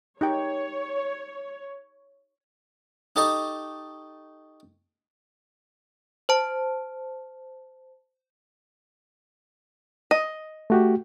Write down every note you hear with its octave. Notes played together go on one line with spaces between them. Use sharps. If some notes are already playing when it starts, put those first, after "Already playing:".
D#4 G4 C#5 G5
D#4 G4 A4 D#5 C#6
C5 A5
D#5
A3 F#4 G4